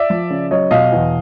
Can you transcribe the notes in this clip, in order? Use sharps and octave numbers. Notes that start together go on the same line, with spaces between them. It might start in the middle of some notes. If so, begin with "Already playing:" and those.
Already playing: D5 E5
F3
C#3
F#3 C#5 D#5
B2 D#5 F5
E2